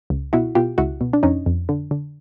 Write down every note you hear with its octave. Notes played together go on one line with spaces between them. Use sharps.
C#2
B2 E4 F#4
B2 F4 G4
C#2 E4 F#4
B2
D4
F2 C#4 D#4
F2
D3
D3